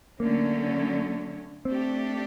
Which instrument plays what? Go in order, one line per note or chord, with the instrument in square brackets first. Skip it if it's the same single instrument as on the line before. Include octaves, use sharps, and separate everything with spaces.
[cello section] D3 F#3 A3 C#4 [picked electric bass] A#3
[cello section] A3 D4 G4 [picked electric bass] C4